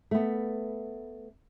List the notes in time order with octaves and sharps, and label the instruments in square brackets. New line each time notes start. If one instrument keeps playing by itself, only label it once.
[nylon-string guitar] A3 B3